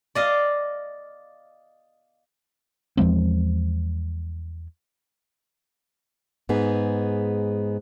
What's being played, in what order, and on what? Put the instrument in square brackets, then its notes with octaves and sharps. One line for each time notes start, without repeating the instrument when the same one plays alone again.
[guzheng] D5 D#5 F5
[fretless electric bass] E2 F3 G#3 C4
[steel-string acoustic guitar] G#2 B3 D#4 G#4 B4